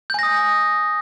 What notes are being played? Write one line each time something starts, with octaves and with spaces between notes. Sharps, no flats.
G#5 D#6 G6 A#6